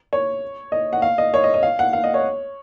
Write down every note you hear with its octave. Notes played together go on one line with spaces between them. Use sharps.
C#5
D#5
F#5
F5
D#5
C#5
D#5
D#5
F5
F#5
F5
D#5
C#5